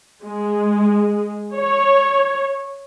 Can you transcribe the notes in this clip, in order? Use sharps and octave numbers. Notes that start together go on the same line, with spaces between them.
G#3
C#5